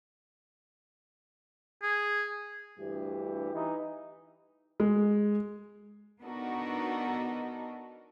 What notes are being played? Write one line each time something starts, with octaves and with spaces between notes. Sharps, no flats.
G#4
D2 G2 E3 G4
E3 D#4
G#3
B3 D4 D#4 F#4 A4 A#4